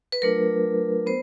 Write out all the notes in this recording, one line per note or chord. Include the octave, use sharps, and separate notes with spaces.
B4
F#3 A3 D4 F4 A#4
B3 C5